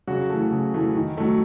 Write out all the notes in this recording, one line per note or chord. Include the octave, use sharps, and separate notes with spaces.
C#3 F#3 F#4
E3 A3
C#3
E3 A3
D#3
F#3 A3